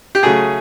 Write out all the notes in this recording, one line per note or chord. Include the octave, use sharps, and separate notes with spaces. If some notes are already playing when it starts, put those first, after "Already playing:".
G4
C#3 F#3 A3 G#4